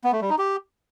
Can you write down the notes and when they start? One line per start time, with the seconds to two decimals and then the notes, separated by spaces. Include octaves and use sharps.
0.04 B3
0.13 A3
0.21 G3
0.30 D#4
0.38 G4